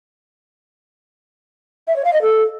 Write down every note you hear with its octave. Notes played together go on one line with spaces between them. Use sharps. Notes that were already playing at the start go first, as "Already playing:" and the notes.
E5
C#5
F5
D#5
A4